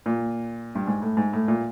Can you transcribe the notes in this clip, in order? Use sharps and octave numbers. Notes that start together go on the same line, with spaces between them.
A#2
G2
G#2
A2
G#2
A2
A#2